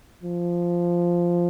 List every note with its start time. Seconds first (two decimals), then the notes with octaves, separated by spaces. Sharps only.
0.23 F3